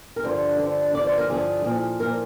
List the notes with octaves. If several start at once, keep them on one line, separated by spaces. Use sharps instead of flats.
A#4
G2 D3 F3 C5
G2 D3 F3
G2 D3 F3 D5
C5
A#4
G2 D3 F3 G#4
A#2 F3
A#2 F3 A#4